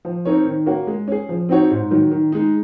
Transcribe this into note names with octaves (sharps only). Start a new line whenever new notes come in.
F3
C4 D#4 A#4 C#5
D#3
A#3 C#4 F#4
G#3
C#4 G#4
F3
C4 D#4 F#4 C#5
G#2
D#3 F#3
D#3
G#3 D#4